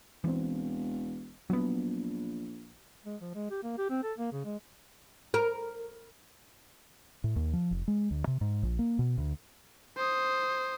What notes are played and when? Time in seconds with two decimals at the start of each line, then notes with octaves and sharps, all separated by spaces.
0.24 E1 E3 C4
1.50 A#1 F#3 B3
3.06 G#3
3.21 F3
3.35 G#3
3.51 G4
3.63 A#3
3.78 G4
3.90 C4
4.03 A4
4.18 A#3
4.32 C#3
4.45 G#3
5.34 A#4
7.24 A2
7.36 D#2
7.53 F3
7.71 F1
7.88 G#3
8.11 D2
8.27 C3
8.41 G#2
8.63 A#1
8.79 A#3
8.99 B2
9.18 D2
9.97 C5 D#6